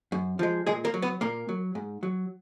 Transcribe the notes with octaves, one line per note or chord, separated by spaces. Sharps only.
F#2
F3 G#3
A#2 G#3 G#4
A#3 A#4
F#3
B3 B4
A#2 A#3 A#4
F#3
G#2
F#3